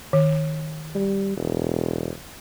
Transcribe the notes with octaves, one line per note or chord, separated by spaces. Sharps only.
D#3
G3
E1